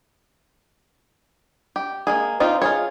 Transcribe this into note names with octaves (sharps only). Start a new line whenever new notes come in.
G4
G#3 A#3 G#4
C4 D#4 F4 G4
F4 G#4 C#5